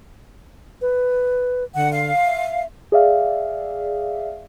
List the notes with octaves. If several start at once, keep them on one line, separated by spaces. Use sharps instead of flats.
B4
D3 F#5
F5
E5
G#4 D5 E5 F5